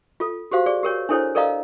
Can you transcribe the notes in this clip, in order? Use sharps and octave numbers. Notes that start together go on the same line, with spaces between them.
F4 A4
F#4 G4 C5 F5
G#4 D5
G4 A#4 C#5
D4 E4 A4 C5 C#5
A4 A#4 D5 D#5 F5 A#5